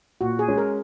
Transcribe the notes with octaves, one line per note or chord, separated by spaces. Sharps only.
A#2 F#4
G#4
G#3 C#4
A#4